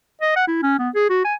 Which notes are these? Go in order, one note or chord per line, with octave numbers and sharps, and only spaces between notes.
D#5
F#5
E4
C#4
B3
G#4
F#4
G#5